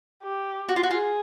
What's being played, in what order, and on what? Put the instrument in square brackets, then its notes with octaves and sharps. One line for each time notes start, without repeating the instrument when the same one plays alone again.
[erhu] G4
[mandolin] F#4
F4
F#4
[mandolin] F4 [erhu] G#4